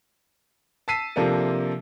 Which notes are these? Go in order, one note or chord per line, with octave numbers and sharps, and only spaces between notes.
A5 E6 B6 C7 D#7
C3 F3 A#3 D4 A4